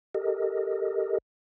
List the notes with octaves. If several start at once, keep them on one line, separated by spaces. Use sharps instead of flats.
G4 A4 A#4 D#5